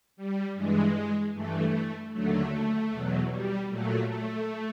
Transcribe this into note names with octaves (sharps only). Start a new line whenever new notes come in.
G3
G2 E3 G#3
G2 E3 A3
D#2 D3 F#3 A3
E2 B2 F#3
G3
A#2 F#3 A3
A3